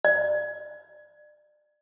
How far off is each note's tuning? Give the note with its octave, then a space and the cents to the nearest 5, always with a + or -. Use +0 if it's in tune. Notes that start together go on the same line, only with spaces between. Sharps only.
D5 +30